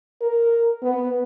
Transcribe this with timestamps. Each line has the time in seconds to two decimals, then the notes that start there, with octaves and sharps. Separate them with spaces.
0.22 A#4
0.82 B3